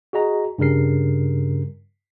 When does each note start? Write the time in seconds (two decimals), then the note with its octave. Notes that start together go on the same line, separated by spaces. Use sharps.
0.13 F#4 G#4 D#5 A#5
0.58 G2 C#3 G3 A#4 C7